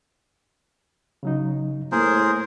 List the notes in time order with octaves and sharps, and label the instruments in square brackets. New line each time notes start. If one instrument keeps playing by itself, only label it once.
[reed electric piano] C#3 F#3 D#4
[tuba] A2 [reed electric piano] A#3 [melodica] G#4 A#4 C5